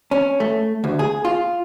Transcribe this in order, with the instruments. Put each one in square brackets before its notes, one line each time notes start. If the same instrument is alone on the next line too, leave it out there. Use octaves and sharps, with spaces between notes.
[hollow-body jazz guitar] C#4
A3
D2
G#4
F4